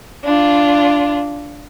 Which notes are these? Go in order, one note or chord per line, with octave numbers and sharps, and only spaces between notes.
D4 F4